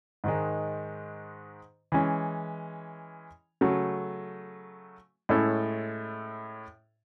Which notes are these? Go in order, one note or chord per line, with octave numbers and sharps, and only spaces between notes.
G#2 D#3 G#3
E3 G#3 C#4
C#3 F#3 A3
A2 G#3 C#4 E4 A4